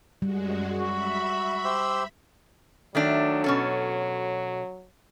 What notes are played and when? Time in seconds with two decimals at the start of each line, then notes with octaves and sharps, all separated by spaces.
0.22 F#2 G3 G#3 F#4
0.80 F#4 E5 B5
1.65 G4 C5 E6
2.95 D#3 F#3 A3 D4
3.44 B2 C#4 A4